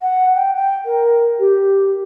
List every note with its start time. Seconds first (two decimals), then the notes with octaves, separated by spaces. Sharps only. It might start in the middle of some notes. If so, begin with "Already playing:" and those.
0.01 F#5
0.35 G5
0.55 G5
0.85 A#4
1.39 G4